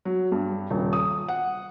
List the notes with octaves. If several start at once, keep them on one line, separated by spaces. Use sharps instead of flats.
F#3
G2
D#1
D#6
F#5